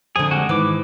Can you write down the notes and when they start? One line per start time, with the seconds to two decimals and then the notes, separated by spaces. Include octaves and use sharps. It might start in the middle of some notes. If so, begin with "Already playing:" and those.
0.16 F2 D3 G#4
0.31 G3 G#3 F#4
0.49 G#2 D#3 E3 B4 D6